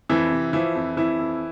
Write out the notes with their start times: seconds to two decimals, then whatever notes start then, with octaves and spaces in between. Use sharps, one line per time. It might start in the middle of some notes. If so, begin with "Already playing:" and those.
0.09 F2 E3 E4
0.31 C3
0.53 E3 F3 E4
0.75 F2
0.96 F2 E3 E4
1.19 F2